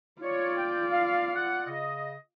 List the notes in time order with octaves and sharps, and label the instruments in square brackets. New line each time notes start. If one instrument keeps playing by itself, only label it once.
[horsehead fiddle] F4 D5 [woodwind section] C#5
[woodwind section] G5
F5
F#5
C#3 D#5